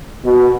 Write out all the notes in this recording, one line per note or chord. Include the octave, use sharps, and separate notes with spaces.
B2